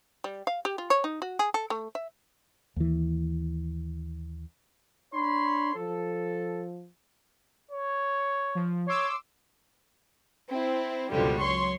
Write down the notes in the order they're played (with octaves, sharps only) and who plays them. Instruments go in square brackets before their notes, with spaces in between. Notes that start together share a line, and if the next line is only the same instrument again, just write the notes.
[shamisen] G3
F5
G4
F4
C#5
D#4
F#4
G#4
A4
A3
E5
[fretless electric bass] D#2 E3
[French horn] D4 [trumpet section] C#5 B5 C6
[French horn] F3 [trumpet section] A4
[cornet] C#5
[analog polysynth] F3
[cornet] C#5 [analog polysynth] C6 D6 E6
[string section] C4 E4
C#2 F#2 B2 D3 F3 G3
F#3 C#5 C6 C#6